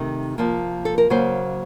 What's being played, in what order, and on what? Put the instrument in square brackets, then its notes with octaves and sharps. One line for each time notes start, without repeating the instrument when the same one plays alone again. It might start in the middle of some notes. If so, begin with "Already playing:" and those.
Already playing: [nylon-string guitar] C3 D#3 A3
C3 F3 A#3
A4
A#4
C#3 F#3 A#3 C5